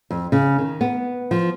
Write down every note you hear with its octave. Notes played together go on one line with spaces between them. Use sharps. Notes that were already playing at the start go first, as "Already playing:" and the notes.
F2
C#3
D#3
B3
F3